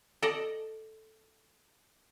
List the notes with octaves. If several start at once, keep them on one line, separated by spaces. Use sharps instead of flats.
A4 D5 D#5